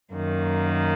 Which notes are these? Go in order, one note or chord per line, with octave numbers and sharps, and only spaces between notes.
F#2 D#3 A#3